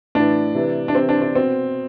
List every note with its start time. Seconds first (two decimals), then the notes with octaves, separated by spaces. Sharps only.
0.15 A2 E3 D4
0.55 C3 E3
0.88 D4
0.95 C3 E3 C4
1.09 D4
1.22 D4
1.35 B2 C4